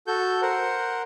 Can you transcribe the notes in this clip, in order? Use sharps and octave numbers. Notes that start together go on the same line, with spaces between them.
F#4 A4 G6
A#4 C5 F#5